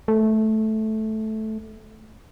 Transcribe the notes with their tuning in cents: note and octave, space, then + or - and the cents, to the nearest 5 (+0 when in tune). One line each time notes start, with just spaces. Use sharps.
A3 -10